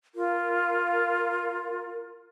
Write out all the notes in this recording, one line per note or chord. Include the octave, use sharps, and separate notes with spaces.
F4 A#4